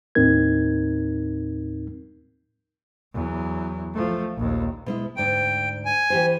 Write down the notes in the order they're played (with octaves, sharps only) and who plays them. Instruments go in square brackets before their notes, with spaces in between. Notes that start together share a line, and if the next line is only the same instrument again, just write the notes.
[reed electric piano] D#2 A2 C4 D#4 A#4 G#6
[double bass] E2 F#3
F3 A3
A#1 D#2
[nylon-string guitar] B2 G#3 E4
[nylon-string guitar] D2 G#2 D5 [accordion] G5
[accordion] G#5
[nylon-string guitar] E3 G4 C5